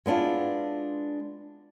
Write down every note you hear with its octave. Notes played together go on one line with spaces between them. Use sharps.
G#3 B3 D4 E4 F4